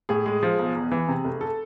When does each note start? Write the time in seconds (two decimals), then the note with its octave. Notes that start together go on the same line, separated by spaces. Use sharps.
0.09 A2 G#4
0.26 G#3
0.43 F3
0.59 B1
0.75 E2
0.92 E3
1.08 C3
1.24 F1
1.41 A4